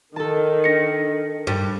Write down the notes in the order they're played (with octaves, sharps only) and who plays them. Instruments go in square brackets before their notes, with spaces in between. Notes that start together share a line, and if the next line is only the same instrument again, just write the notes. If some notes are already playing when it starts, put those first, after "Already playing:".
[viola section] D#3 [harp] A4 A5
[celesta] D4 A#6 C#7
[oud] G2